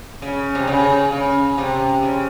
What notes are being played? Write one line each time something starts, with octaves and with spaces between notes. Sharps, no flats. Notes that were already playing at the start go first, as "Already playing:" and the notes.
C#3
C3
C#3
C#3
C3
C#3